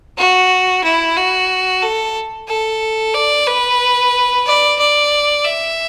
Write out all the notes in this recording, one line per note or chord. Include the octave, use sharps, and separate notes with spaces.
F#4
E4
F#4
A4
A4
D5
B4
D5
D5
E5